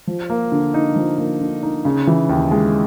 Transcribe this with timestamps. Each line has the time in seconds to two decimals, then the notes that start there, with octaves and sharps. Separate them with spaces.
0.07 F3
0.30 A#3
0.52 D3
0.74 D#4
0.96 F3
1.18 A#3
1.41 D3
1.63 D#4
1.85 C#3
2.07 E3
2.29 D#2
2.51 G#3